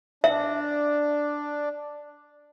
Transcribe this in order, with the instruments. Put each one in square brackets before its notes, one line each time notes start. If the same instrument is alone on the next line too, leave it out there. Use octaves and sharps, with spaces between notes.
[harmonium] D4 [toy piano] E5